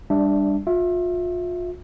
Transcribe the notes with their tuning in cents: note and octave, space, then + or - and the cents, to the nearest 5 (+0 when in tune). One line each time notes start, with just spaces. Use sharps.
G3 +20 D4 +0 E5 +0
F4 +35 E5 +0